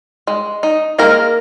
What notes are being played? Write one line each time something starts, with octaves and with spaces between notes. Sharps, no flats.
G#3
D#4
G#3 A#3 A#4